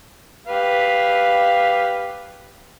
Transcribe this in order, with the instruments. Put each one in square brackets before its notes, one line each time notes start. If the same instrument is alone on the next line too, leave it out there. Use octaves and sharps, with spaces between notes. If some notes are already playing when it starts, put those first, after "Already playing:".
[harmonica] G4 B4 F5